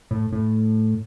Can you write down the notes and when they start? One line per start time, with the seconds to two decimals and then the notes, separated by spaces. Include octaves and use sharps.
0.11 A2
0.33 A2